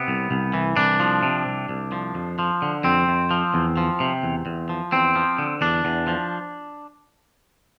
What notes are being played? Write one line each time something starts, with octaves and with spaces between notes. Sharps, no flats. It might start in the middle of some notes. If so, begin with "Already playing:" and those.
Already playing: C3 B3
C2
C2
E3
C2 D4
F3
C3
C2
C2
F3
F2
F3
D3
F2 C4
F2
F3
E2
F3
C3
E2
E2
F3
E2 C4
F3
D3
E2 D4
E2
F3